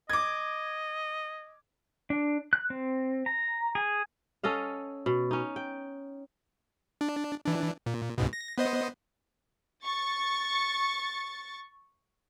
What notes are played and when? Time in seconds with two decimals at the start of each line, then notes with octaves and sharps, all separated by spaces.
0.10 D#5 D6 G#6
2.10 D4
2.53 F#6
2.70 C4
3.26 A#5
3.75 G#4
4.43 C#4 A4 D#5 F5
5.06 B2
5.31 C#4 D#4
5.56 G5
7.01 D4
7.45 E3 D4
7.86 A#2
8.18 C#2 G#2 B2
8.33 A#6
8.58 B3 C5 D#5
9.85 C#6 A6